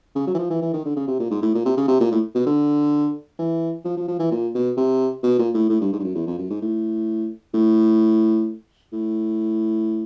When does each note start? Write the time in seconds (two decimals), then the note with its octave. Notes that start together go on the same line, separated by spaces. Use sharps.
0.15 C#3
0.27 F#3
0.34 E3
0.38 F3
0.50 E3
0.61 E3
0.73 D#3
0.85 D3
0.96 C#3
1.08 C3
1.19 A#2
1.31 G#2
1.42 A2
1.54 A#2
1.65 C3
1.77 C#3
1.88 C3
2.00 A#2
2.12 A2
2.35 B2
2.46 D3
3.39 E3
3.85 F3
3.97 F3
4.08 F3
4.19 E3
4.31 A#2
4.54 B2
4.77 C3
5.23 B2
5.38 A#2
5.54 A2
5.69 A2
5.81 G2
5.92 G#2
5.99 G2
6.04 F#2
6.15 E2
6.27 F2
6.38 F#2
6.50 G#2
6.62 A2
7.54 A2
8.92 A2